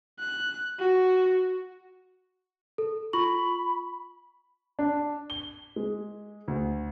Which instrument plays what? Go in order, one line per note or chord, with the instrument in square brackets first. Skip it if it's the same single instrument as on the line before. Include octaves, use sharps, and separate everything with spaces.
[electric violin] F#6
F#4
[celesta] A4
[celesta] F4 C#6 F#7 [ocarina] B5
[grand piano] D4
G7
G#3
D2